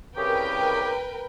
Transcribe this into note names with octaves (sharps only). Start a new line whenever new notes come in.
C2 C#3 G4 A#4 B4 G5